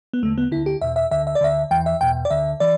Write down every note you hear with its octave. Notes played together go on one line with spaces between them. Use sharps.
B3
E2 D3 A3
B3
D2 D3 E4
G4
E2 B2 E5
E5
D2 D3 E5
E5
D5
D2 D3 E5
E2 E3 G5
E5
E2 B2 G5
D5
D2 D3 E5
E3 D5